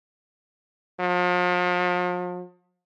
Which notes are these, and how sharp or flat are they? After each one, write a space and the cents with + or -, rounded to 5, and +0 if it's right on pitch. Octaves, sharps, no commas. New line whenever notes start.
F3 +40